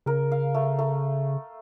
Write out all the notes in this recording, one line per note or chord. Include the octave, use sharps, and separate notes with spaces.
C#3 A#4
F5
A3
A3